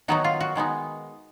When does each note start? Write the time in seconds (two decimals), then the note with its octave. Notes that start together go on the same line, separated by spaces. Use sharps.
0.08 D#3 F#3 B3 D#4 F#4
0.24 F4
0.40 F#4
0.56 D#3 G#3 B3 D#4